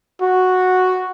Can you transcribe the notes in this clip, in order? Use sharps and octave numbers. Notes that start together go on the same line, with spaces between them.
F#4